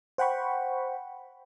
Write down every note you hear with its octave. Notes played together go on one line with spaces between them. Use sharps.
C5 F#5 G5 B5 C#6